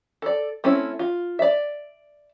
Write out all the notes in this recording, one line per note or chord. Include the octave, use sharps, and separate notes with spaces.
A4 D5
A3 C4 C#4 E4
F4
D5 E5